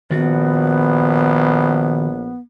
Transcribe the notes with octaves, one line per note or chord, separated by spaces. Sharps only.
A#1 D#3 B3 F#4